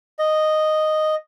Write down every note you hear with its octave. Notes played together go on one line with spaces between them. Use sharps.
D#5